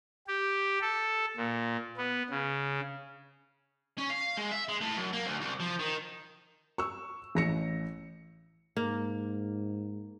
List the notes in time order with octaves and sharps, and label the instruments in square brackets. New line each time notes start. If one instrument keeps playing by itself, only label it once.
[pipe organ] G4
A4
A#2
B3
C#3
[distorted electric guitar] C#4
F5
G#3
E5
G#3
A2
F#2
A#3
D2
C2
F3
D#3
[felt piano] C#6 E6
A1 A#6 C#7
[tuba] G#2 [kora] A#3